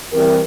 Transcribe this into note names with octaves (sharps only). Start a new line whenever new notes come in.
E3 G3 C4 G4 A#4